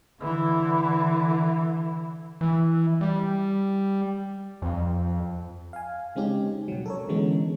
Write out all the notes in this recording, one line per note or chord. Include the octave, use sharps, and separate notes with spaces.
D3 E3
E3
G3
F2
F5 G#5
C#3 G#3 C4 C#4 D#4 G4
B2 F#3
A4 A#4 C#5
D3 E3 G#3 B3 C#4